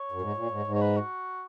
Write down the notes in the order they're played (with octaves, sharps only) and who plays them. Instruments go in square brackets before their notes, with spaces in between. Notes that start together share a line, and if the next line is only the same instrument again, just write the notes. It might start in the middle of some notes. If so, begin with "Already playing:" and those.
Already playing: [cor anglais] C#5
[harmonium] F#2
G#2
A#2
G#2
G#2
[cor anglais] C#5
B4
F#4